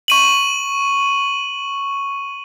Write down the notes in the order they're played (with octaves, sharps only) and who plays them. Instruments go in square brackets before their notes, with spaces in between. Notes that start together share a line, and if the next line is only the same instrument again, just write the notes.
[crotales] C#6 D#7 F#7